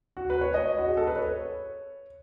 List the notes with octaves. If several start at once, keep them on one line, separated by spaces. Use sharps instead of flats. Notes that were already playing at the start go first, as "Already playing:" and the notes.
F#4
B4
C#5
D#5
F#4
G#4
A4
B4
C#5